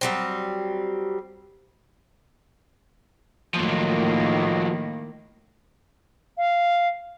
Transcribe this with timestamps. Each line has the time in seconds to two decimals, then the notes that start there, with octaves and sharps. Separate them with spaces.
0.01 F#3 G3 C4
3.54 A2 D#3 F3 F#3 A#3
6.37 F5